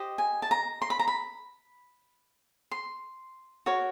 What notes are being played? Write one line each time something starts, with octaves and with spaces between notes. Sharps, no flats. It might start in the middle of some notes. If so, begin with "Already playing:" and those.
Already playing: G4 C5 D#5
G#5
A5
A#5
C6
B5
A#5
B5
C6
F#4 A#4 C#5